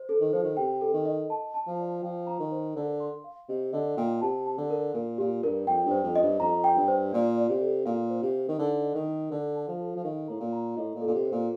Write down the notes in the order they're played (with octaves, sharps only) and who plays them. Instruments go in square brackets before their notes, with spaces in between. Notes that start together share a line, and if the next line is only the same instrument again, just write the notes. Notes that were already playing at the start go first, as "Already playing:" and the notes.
Already playing: [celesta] C5
A4
[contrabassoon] D#3
[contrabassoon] F3 [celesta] C5
[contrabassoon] D#3
[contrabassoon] C3 [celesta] G5
[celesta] A4
[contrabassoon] D#3
[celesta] D#5
A5
A5
[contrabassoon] F3
[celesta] D5
[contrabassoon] F3 [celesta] G5
[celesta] A#5
[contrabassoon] D#3
[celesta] C5
[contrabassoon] D3 [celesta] A#4
[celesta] C6
F5
[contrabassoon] C3 [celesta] D#5
[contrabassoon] D3 [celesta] D#5
[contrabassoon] A#2 [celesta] G5
[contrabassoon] C3 [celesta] A5
[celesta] A5
[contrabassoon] D3
[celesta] A#4
[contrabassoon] A#2 [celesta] A#4
[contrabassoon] A#2 [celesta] G4
[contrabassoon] G2 [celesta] A#4
[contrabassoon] F2 [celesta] G5
[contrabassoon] G2
[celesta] C5
[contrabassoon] F2
[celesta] D#5
[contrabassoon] G2
[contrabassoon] F2 [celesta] A#5
[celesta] G5
[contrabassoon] G2
[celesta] C5
[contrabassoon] A#2 [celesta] D5
[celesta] D5
[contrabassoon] C3
[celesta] A4
[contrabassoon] A#2 [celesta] F5
[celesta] C5
[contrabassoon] C3
[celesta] C5
[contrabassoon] D#3
[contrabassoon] D3 [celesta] D#4
[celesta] D#5
[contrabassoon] D#3
[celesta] D#4
[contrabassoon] D3 [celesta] A4
[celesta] A5
[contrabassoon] F3
[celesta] A4
[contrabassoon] F3
[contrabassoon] D#3 [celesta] F5
[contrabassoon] A2 [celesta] A#5
[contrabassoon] A#2
[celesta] A#5
[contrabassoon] A2 [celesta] D#5
[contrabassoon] A#2
[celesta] A4
[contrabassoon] A#2
C3
[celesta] C5
[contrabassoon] A#2